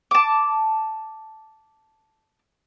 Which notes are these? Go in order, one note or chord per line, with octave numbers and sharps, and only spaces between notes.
A5 D6